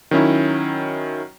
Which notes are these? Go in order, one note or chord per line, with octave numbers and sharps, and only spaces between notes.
D#3 F#3 C#4 E4